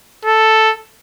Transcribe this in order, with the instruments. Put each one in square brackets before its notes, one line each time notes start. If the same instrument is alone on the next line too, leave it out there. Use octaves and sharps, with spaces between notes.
[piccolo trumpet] A4